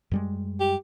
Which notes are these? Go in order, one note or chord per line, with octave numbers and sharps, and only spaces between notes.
F#2 G3 G#3
G4